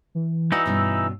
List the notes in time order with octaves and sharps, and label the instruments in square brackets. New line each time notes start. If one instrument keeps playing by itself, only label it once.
[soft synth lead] E3
[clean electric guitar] E3 D#4 [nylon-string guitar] F#4 D5 F#5 [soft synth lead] E6
[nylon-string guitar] G2 B2 C#4